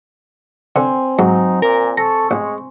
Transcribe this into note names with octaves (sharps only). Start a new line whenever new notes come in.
D3 C4 G#5
G#2 F#3 D#4
A#2 A#4
A4 A#5 C#6
A1 G#3